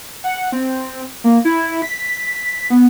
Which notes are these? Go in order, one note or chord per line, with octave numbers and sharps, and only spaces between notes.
F#5
C4
A#3
E4
B6
B3